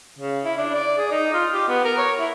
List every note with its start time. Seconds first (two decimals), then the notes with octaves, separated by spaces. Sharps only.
0.19 C#3
0.45 E4
0.58 D4
0.75 D5
0.98 G#4
1.12 D#4
1.34 F4
1.53 G4
1.69 B3
1.85 A#4
1.98 C#5
2.19 E4